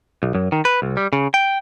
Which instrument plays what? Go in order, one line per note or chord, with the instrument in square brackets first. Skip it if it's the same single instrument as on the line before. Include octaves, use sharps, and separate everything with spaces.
[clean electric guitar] B1
F#2
D#3
B4
C2
G3
C#3
G5